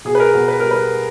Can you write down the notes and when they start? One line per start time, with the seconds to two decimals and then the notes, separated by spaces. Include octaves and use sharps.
0.05 B2 G#4
0.15 B4
0.20 A#4
0.34 B2 A#4
0.48 B4
0.60 G3 A#4
0.71 B4